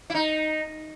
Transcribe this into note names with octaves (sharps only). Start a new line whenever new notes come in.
E4
D#4